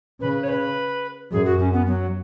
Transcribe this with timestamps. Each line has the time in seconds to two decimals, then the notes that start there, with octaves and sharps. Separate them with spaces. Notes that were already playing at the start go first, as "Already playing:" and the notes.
0.21 C#3 B4
0.43 C#5
0.49 B4
1.31 F#2 G#4
1.45 F#4
1.59 C#4
1.73 B3
1.87 F#3